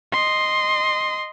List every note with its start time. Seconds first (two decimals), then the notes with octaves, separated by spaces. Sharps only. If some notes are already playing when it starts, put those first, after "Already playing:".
0.12 D#5 C6